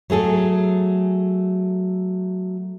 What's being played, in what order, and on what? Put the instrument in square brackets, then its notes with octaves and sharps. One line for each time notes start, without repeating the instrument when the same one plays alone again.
[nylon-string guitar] F#3 A3 G#4 A4